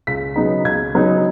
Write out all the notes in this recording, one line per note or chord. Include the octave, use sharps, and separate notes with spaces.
C#2 B6
C#3 F#3 B3 D#4
C#2 G#6
C#3 F#3 B3 D#4